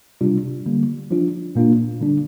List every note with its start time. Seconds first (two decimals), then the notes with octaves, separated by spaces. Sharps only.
0.21 C3 G3 D4 F4
0.66 D3 G3 A#3
1.11 F3 D4 F4
1.55 A#2 A#3 D4 F4
2.00 D3 G3 D4